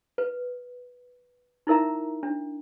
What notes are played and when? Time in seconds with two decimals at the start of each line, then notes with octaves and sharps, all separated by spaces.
0.18 B4
1.67 D#4 E4 A#4 E5 A#5
2.23 D4